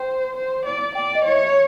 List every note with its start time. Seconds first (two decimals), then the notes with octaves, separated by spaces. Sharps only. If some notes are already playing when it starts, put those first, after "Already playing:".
Already playing: C5 G5
0.36 C5
0.66 D5
0.95 D5 G5
1.15 D#5
1.25 C#5
1.34 E5